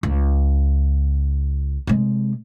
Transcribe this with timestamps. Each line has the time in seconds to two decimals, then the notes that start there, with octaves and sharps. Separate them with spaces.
0.03 C#2
1.87 C3 G#3